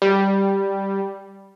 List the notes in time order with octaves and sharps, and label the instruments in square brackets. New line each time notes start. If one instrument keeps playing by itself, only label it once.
[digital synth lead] G3